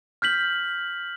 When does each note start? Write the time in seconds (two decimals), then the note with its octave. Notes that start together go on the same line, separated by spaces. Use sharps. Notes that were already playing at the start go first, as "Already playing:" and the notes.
0.22 F6 G6 B6 F#7